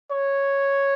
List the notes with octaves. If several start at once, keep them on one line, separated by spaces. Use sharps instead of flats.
C#5